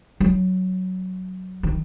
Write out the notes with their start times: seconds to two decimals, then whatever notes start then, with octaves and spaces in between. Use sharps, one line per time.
0.20 F#3
1.63 D#3